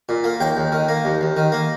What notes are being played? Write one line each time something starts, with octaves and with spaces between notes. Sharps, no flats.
A#2
A#3
D#2 G5
D#2
D#3
A#3
D#2
D#2
D#3
A#3